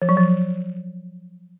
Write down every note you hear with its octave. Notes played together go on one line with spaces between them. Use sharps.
F3
F#3
F3